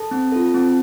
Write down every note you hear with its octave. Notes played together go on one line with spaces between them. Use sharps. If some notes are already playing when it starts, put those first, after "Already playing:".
Already playing: A4 A5
C4
F4 A4
C4